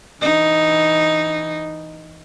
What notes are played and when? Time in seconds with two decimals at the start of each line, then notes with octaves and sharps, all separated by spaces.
0.21 E3 D#4